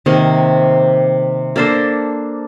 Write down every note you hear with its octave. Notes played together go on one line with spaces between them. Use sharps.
C3 D#3 A#3
A#3 D4 A4 C5